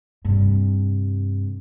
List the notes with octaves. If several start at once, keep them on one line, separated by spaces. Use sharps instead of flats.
G2 C3